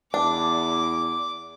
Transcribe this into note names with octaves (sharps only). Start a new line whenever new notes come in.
E2 D4 D6